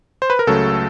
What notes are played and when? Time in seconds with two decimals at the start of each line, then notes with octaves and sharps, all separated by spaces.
0.22 C5
0.30 B4
0.39 A#4
0.47 C#2 C#3 F#3 A3 A4